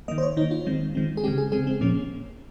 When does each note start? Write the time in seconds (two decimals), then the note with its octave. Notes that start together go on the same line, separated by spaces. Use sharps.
0.08 D#3 A#3 D#5
0.18 C5
0.23 C#5
0.37 D#3 D#4
0.41 A#3
0.51 F4
0.66 D#3 G#3 C4
0.95 D#3 G#3 C4
1.17 G#4
1.24 C#3 G#3 C4 G4
1.38 G#4
1.52 C#3 G#3 C4 G#4
1.67 C4
1.81 A#2 F3 A#3 C#4